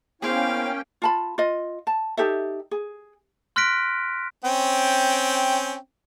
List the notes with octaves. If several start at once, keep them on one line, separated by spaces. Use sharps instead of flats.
A#3 B3 C#4 E4 G#4 C5 F5 G5
F4 A5 B5
F4 D#5
A5
D#4 G4 A4 E5
G#4
C6 F6 F#6 A#6 B6 D7
C4 C#4 G5